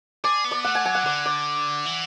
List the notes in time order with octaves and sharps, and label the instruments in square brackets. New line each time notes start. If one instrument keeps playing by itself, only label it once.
[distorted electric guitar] G#4 [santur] D5
[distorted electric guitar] B3
[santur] D5
[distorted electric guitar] A3 [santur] F#5
[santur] G#5
[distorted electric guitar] F#3 [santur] G#5
[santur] F#5
[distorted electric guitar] D3 [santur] D5
[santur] D5
[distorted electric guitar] E3